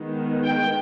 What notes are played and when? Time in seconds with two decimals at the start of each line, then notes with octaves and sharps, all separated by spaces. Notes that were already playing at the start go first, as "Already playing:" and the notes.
Already playing: D#3 G#3 B3
0.44 G5